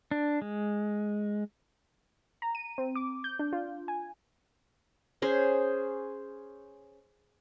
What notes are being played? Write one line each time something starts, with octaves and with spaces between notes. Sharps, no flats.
D4
G#3
A#5
D#7
C4
D6
G6
D4
F4
G#5
C#4 G#4 C5